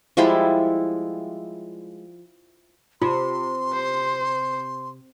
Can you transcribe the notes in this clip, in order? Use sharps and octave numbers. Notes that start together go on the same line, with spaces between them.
F3 G3 G#3 E4
C3 F4 C6
C5